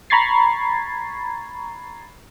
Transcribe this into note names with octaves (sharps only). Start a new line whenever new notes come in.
A#5 B5 C#6 G#6 A6 C7